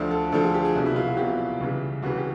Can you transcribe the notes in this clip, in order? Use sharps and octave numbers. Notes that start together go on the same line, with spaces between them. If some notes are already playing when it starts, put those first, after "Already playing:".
Already playing: D2 D3 F3
A4
D2 D3 F3 A4
G#4
G4
G#4
C2 B2 F#3
E4
F4
F#4
C2 B2 F#3 G4
C#2 C#3 E3 G3
C#2 C#3 E3 G3 F#4
G4